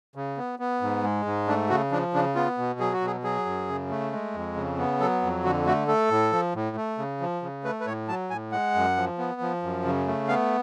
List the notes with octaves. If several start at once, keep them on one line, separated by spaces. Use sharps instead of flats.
C#3
B3
B3
G#2
G#3
G#2
A3 D4
C#3 F#4
F3 D4
C#3 D4
B3 F4
B2
F#3 G#4
F#4
B2
G#4
F#3 G#4
F#2
C#3
A3
G#3
F2
C#3
B3
F#3 A4
F2
D3 F#4
A3 F#4
A3 A4
A2
F3
A2
A3
C#3
F3
C#3
A3 B4
B4
A2 C#5
F#3 A5
A2 G#5
G#3 F#5
F#2
F3
B3
F3
F#2
C#3
A3
B3 F5